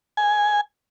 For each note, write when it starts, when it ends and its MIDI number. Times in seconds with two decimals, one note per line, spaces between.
0.17 0.61 80